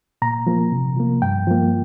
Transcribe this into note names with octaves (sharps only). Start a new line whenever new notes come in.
A#2 A#5
F3 A#3
C3
F3 A#3
G2 G5
F3 A#3